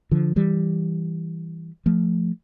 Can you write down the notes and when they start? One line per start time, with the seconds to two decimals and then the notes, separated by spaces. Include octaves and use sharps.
0.11 D3 F3
0.36 E3 G3
1.86 F3 A3